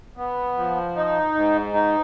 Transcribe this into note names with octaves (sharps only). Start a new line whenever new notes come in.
B3
F3
D#4
G#2
D#4